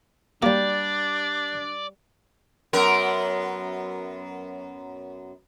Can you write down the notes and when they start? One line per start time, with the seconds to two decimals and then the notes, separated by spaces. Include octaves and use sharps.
0.43 G3 A#3 D4 G4 D5
2.73 F#2 B3 A#4